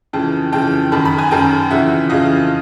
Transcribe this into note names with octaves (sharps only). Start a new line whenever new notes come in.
F2 C#3 E3 G5 A5
F2 C#3 E3 G5 A5
F#2 D#3 A5 B5
A5 B5
G#5 A#5
F#2 D#3 G5 A5
F2 C#3 E3 E5 F#5
F2 C#3 E3 D#5 F5